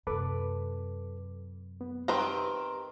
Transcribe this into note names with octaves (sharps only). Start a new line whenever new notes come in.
F#2 C3 A4 B4 D6
B3
D#3 C4 G4 B4 A#5 C6